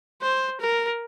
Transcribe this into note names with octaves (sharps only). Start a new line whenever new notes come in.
C5
A#4